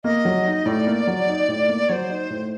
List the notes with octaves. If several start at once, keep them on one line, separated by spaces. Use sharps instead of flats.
A#3 D#5
F#3
D#4
A2 D5
A#3
F#3
D#4
A2
A#3
F#3 C5 C#5
D#4
A2